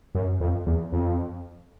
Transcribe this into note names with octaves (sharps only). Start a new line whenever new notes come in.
F#2
F2
E2
F2